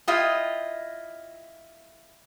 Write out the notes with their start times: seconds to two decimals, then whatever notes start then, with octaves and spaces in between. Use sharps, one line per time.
0.08 E4 F4 D#5 G5